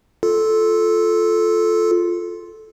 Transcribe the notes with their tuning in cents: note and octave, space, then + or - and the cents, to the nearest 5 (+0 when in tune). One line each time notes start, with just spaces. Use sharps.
F4 +0 A4 -10